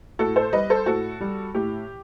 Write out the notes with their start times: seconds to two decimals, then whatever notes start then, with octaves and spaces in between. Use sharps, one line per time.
0.19 A2 F#4 A4
0.36 A4 C5
0.53 G3 B4 D#5
0.70 A4 C5
0.86 A2 F#4 A4
1.20 G3
1.54 A2 G4